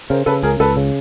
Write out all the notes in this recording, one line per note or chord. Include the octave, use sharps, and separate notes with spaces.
C#3 A#4 C5
C#3 A4 B4
C#2 G#4 A#4
C#2 A4 B4
C#3